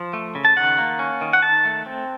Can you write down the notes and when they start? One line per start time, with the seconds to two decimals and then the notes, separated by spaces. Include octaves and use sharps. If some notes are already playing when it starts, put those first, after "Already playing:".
Already playing: F3
0.13 A3
0.35 C#3
0.45 A5
0.56 D#3 F#5
0.78 A#3
0.99 C#4
1.21 D#3
1.33 F#5
1.42 D#3 A5
1.65 A3
1.86 C4